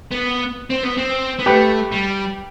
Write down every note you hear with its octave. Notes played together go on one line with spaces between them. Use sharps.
B3
C4
B3
C4
B3
A3 G4 B4
G3